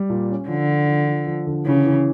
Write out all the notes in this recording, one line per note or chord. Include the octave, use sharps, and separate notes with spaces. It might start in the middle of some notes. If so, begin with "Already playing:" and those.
Already playing: G3
A#2
C#4
D3 F3
F3
F3
F3
F3
D3
C#3 E3
E3